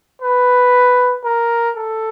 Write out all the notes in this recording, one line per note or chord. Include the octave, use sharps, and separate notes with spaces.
B4
A#4
A4